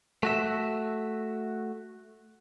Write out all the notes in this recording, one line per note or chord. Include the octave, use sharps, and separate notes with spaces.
A3 F#4 E5